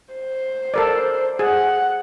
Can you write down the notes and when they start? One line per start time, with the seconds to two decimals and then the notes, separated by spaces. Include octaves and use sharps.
0.14 C5
0.74 A4 A#4 D5
1.39 G#4 F#5